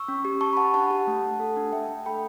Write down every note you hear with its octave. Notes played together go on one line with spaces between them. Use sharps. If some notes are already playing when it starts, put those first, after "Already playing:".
Already playing: C#6 E6
C#4
G4
G4 A5 C#6
B5
G4 F#5 A5
D4 F#5 A5
G4
A3
A3
A4
D4
A3 E5 G5
A3
A4 G5 B5